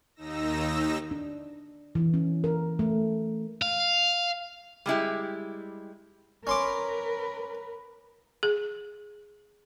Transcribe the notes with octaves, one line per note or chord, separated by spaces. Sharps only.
D#2 D#4 E6 A#6
D4
E3
C#4
A#4
A3
F5
G3 G#3 E4 G4
C#4 A#4 B4 C6 D6
G#4